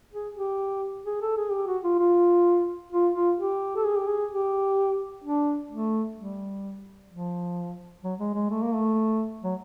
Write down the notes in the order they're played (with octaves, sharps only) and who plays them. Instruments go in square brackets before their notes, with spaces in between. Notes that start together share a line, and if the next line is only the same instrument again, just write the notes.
[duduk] G#4
G4
G#4
A4
G#4
G4
F#4
F4
F4
F4
F4
G4
A4
G#4
G4
G#4
G4
D4
A3
G3
F3
F#3
G#3
G#3
A3
A#3
A3
F#3